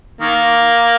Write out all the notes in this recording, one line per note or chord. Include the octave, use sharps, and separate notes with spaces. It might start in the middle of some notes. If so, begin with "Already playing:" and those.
D#3 A#3